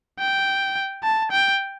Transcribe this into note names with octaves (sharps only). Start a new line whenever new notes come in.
G5
A5
G5